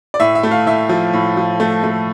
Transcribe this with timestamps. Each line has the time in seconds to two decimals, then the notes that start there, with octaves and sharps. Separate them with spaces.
0.14 D5
0.20 A2 E5
0.35 E5
0.43 A3
0.51 F5
0.66 A2 E5
0.89 F3
1.13 A2
1.37 F3
1.60 A3
1.83 A3